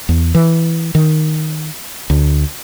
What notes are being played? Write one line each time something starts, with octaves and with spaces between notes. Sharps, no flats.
E2
E3
D#3
D2